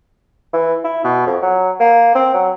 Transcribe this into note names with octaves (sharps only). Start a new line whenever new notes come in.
E3
E4
B2
F2
F#3
A#3
C4
F#3